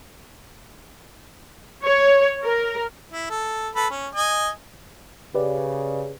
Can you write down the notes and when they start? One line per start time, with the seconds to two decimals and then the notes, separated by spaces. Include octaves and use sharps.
1.84 C#5
2.44 A#4
3.11 E4
3.30 A4
3.75 A4 B4 B5
3.90 C#4
4.15 D#5 G#5
5.34 C#3 G4 B4 D5